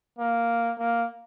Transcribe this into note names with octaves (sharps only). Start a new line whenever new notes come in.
A#3
A#3